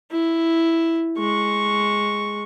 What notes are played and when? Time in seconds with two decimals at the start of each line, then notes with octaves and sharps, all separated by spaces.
0.11 E4
1.18 G#3 C#6